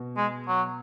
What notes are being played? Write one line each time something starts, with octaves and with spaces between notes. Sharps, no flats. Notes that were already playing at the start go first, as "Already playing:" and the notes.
Already playing: B2
G#3
F#3